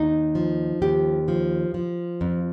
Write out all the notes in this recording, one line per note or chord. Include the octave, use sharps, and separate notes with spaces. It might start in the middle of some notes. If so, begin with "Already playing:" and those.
Already playing: D#2 D#4
F3
D#2 G4
F3
F3
F2